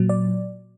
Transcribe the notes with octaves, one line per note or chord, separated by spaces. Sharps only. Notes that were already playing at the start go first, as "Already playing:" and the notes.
Already playing: A#2 F#3
D5